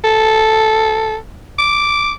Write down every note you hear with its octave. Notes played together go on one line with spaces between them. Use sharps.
A4
D6